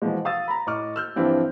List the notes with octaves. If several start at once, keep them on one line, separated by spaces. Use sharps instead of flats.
B2 E3 F3 G#3
F5 D#6 E6 A6
A#5 B5
A2 D#5 C#6 D6 F6
E6 F6 G6
G2 E3 F3 C4 D4 E4